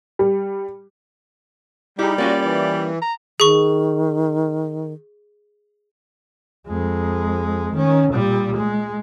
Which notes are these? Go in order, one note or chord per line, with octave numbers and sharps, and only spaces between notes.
G3
G3 D#4 E4 G4 G#4
A#3 C#4 F4 F#4 D5
E3 D5
A#5
D#3 G#4 C#6
F2 G#3
D#3 C#4
A#2 G3
G#3